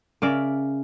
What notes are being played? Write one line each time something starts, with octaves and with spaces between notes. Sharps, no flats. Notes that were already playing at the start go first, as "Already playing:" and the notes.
C#3 A#4 D5 E5